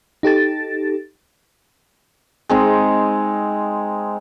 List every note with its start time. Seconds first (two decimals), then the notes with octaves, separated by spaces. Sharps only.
0.23 D#4 G4 A4 A6
2.49 G#3 C4 D#4